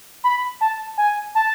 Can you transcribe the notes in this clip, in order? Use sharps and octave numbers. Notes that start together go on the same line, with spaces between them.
B5
A5
G#5
A5